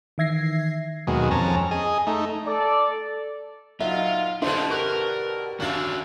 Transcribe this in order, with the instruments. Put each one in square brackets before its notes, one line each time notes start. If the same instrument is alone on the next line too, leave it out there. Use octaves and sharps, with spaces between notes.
[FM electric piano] D#3 E3 E5 G#6 A#6 C7
[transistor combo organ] D#2 B2 F#3 G#3
F2 C#4 A5 A#5
G#4 D#5
A3 D#4
[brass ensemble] A4 D5
[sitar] A#2 [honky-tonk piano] F#3 D#4 [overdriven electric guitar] F4 [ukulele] E5
[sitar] B2 D3 G3 [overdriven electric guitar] D4 D#5 [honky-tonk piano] E4 A4 [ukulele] C5
[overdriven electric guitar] A#4 [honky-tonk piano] C#6 F#6
[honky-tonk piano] G#1 F5 F#7 [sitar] C#4 D4 [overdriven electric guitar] F#4 E5